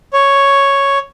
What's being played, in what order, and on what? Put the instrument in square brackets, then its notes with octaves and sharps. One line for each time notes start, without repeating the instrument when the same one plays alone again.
[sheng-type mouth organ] C#5